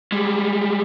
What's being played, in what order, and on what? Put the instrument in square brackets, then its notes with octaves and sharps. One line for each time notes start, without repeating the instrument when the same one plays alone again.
[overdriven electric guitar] G3 G#3